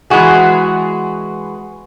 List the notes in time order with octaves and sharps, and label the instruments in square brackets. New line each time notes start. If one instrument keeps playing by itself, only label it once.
[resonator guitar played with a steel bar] E3 G#3 B3 F#4 G#4